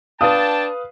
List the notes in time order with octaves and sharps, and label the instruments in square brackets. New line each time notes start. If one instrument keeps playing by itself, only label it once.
[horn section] D4 G5 A5 [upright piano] B4 F5 D#6